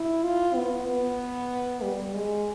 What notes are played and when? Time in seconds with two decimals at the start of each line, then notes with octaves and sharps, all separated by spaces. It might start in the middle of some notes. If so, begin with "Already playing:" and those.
Already playing: E4
0.24 F4
0.55 B3
0.87 B3
1.82 G3
2.14 G#3